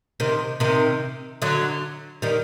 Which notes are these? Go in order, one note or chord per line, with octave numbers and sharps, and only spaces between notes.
C3 D#3
C3 D#3
D3 F#3
D#3 G3